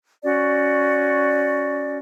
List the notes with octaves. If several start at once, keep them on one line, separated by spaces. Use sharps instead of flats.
C#4 F#4 D5